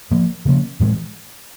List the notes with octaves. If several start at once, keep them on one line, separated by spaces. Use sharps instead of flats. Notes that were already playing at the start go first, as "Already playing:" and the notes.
A2 F3 A#3
C#3 F3 A#3 C#4
A2 E3 G#3